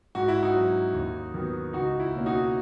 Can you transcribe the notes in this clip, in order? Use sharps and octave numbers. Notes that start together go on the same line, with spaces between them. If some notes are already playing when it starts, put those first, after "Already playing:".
G#2 F#4
E4
D#4 F#4
F#3 C#4
D#2
D#3 F#3 B3
C#2 D#4 F#4
E4
B2 A#3 C#4
D#4 F#4